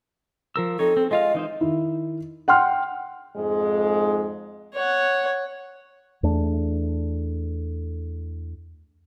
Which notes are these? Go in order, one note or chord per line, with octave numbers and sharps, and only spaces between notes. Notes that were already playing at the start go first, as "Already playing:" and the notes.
F3 A#4 E6
C4 D#4 A4 C#5
C4
G#3 F4 D#5 F5
E3 D#4 C5
D#3 E4
F#5 G5 C6 F6
F2 G#2 G#3
C#5 F#5
E2 A3 D4